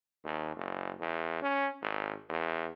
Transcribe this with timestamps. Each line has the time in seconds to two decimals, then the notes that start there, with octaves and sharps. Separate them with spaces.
0.24 D#2
0.56 F#1
0.99 E2
1.42 C#4
1.81 G#1
2.29 E2